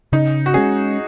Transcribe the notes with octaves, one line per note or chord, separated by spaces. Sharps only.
C#3 D#4
F#4
G#3 C#4 G#4